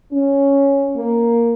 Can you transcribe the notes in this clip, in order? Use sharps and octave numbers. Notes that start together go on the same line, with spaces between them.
C#4
A#3